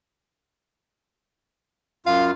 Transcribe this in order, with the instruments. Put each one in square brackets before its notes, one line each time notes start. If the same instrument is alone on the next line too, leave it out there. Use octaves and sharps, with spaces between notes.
[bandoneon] F#2 F4 [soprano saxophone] F5